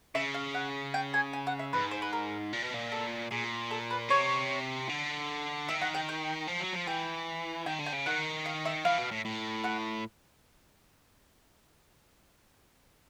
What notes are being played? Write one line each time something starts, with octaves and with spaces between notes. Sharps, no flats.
C#3 E5
F5
F#5
G5
G#5
G#5
F#5
E5
G#2 B4
C5
B4
A#4
A#2
B2
A#2
A4
A#2 G#4
A4
B4
C3 C#5
D3
D#3 E5
F#5
G5
G5
F3
F#3
F3
E3 G5
D#3 G5
D3
G5
C#3
D#3 F#5
F5
E5
E3 F5
B2
A2
A2
F#5